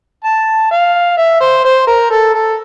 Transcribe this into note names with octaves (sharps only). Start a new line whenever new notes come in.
A5
F5
E5
C5
C5
A#4
A4
A4